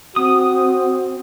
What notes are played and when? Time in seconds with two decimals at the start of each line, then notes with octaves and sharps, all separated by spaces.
0.16 C4 F#4 D#6